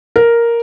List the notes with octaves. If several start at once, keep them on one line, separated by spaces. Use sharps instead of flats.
A#4